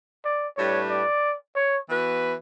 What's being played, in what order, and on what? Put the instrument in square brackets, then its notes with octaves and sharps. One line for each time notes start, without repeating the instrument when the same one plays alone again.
[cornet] D5
[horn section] A2 G3 D4 G4 B4 [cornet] C#5
[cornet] D5
C#5
[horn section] E3 B3 F#4 B4